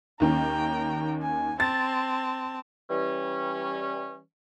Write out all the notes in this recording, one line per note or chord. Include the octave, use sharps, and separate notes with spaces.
D#2 D#3 C#4 G5 A#5
G#5
C4 A5 A6
E3 G3 C#4